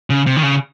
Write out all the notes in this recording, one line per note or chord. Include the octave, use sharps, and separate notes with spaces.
C#3
C3
D#3
C#3